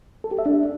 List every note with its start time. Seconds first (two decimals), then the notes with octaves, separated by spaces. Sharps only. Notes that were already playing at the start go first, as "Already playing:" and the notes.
0.24 A4
0.31 G4
0.39 E5
0.46 D4